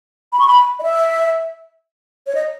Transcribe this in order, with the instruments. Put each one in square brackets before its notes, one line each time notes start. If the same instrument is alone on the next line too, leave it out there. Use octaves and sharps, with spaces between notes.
[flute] B5
C#6
B5
D#5
E5
C#5
D#5